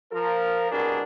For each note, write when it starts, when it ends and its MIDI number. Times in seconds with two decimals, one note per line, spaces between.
0.12 0.69 53
0.12 0.69 70
0.70 1.02 36
0.70 1.02 47
0.70 1.02 62
0.70 1.02 68
0.70 1.02 70